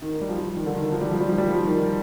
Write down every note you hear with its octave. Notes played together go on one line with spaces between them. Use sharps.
D#3
G3
F3
D#3
D3
D#3
F3
G3
F3
G3
F3
G3
F3
D#3